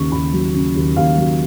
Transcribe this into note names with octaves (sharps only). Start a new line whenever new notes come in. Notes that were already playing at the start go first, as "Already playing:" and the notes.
Already playing: D#2 C#3 C#6
D#2 B5
F#3
C#3
D#2
D#2 F5
F#3